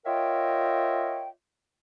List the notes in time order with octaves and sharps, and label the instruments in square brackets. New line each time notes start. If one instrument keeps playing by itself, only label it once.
[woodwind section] F4 A#4 C#5 D#5 E5 G5